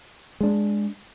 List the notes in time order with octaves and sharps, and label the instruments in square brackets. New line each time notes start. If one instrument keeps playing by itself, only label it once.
[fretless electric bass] G#3 D4